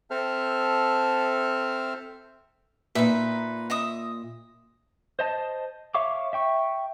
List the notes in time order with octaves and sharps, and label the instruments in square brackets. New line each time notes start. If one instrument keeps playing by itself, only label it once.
[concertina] C4 A4 C5 E5 A5 F6
[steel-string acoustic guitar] A#2 [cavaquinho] D#4 B4 E5
[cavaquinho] D#5 E5 D#6
[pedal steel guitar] C5 D#5 A5
C#5 E5 F5 C#6 D6
E5 G5 C#6